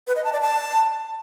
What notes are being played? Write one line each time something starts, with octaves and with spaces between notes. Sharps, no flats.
B4
D#5
A5
D5
A5